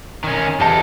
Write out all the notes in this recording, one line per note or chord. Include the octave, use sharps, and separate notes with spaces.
D#3 C#4
E2 G4 A4 D#5 A5